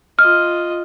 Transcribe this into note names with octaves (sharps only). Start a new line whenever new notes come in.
F4 D#5 F6